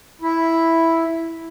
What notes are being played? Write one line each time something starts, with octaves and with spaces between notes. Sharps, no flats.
E4